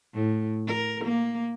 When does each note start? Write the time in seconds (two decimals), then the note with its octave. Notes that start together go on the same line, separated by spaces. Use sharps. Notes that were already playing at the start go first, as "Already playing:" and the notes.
0.14 A2
0.67 A#4
1.04 A#3